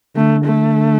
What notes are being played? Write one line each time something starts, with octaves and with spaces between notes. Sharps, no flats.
D3 A3
A3